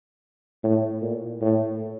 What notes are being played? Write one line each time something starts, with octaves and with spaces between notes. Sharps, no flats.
A2
A#2
A2